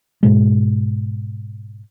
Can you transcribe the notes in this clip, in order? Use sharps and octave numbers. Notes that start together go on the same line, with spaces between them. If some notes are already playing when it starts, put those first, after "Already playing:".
G#2 B2 G#3